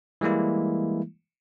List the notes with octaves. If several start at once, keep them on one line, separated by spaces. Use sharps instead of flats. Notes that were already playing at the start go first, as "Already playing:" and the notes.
E3 G3 G#3 A#3 E4